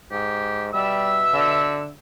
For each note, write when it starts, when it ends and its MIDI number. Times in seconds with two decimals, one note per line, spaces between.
0.11 0.69 44
0.11 0.67 67
0.74 1.88 47
0.74 1.24 55
0.74 1.88 76
0.74 1.88 88
1.33 1.89 50